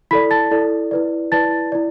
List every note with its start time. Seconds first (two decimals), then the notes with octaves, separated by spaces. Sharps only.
0.11 E4 A4 D5 B5 B6
0.31 A5 A6
0.51 E4 A4 D5
0.91 E4 B4 D5
1.32 E4 B4 D5 A5 A6
1.72 E4 D5